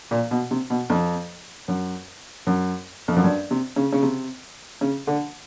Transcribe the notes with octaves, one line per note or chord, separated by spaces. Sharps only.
A#2
B2
C3
B2
F2
F#2
F#2
F2
F#2
G2
C3
C#3
C#3
C3
C#3
D3